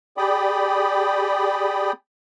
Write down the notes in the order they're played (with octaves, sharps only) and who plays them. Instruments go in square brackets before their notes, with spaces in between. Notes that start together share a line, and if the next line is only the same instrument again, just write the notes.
[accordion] G4 G#4 D5 G5 B5 D#6